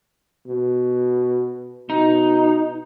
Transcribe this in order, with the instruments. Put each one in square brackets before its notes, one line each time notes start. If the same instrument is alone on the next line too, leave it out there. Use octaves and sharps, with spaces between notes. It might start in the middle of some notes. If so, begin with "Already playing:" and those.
[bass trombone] B2
[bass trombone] B2 [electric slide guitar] D#4